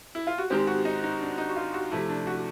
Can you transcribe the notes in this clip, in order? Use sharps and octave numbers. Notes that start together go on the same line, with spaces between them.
E4
F4
F#4
G#2 D#3 G#3 C4 G4
F#4
D#4
D#4
D4
D#4
F#4
F4
F#4
C3 F3 A3 E4
D4
F#4